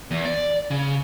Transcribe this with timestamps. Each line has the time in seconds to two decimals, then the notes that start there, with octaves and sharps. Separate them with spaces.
0.11 E2
0.25 D5
0.71 C#3